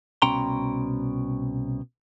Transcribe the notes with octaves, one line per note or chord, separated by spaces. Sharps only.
C2 B2 C#4 G5 A#5 C6